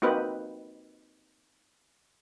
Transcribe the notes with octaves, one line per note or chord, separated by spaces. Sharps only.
A#3 C4 D#4 F#4 B4